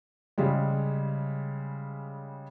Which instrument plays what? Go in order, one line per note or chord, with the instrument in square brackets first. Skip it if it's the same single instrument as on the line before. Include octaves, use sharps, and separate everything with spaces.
[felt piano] C#3 G3 G#3